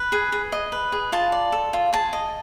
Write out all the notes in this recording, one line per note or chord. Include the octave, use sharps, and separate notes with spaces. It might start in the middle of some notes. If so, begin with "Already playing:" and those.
Already playing: B4
G#4
G#4
D#5
B4
G#4
F4 A5
D5
A4
F4
G#4 A5
D#5